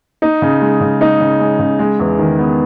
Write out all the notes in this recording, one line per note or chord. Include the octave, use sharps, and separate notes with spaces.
D#4
C#3
G#3
C#3
D#4
C#3
G#3
C#3
G#3
E2
D#3
B3